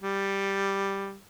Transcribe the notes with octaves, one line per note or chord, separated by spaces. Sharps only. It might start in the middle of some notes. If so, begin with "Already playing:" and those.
G3